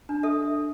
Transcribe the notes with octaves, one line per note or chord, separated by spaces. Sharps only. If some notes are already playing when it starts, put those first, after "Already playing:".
D4
A4 E5